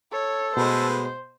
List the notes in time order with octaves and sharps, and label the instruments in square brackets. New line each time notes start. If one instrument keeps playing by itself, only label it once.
[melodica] A4 [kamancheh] C#5
[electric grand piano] B2 [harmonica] G#3 A3 B4 [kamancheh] C5